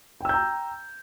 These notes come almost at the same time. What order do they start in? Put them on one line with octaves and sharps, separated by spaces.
G5 E6 G6 A#5